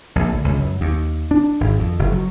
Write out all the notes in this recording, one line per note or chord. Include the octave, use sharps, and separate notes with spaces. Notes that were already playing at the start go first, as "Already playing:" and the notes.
A#1
D2
C#2
F#2
D#2
D4
G#1
F2
F#1
F#3